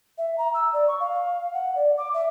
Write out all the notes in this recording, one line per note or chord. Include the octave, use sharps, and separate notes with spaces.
E5
A#5
E6
D5
C#6
F5
F#5
D5
D6
E5